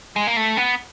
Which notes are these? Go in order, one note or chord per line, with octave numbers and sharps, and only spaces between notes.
G#3
A#3
A3
B3